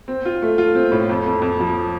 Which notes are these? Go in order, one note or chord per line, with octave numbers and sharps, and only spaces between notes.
C4
F4
A3
F4
C4
A2
F2
F2
F2
F3